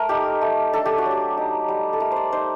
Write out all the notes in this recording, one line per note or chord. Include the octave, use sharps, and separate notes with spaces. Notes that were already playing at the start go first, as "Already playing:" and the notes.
Already playing: A3 A#4
D#4 G4
A3
D4 A4
G4
F#4
F#3
G4
D#4
G3
A4
A3 A#4
C5 D5
D#4 C5